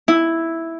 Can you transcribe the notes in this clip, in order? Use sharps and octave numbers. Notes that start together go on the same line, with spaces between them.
E4